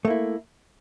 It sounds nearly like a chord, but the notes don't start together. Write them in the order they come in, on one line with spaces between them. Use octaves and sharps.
A3 A#3 E4